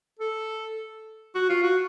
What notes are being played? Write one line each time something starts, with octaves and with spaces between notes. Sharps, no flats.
A4
F#4
F4
F#4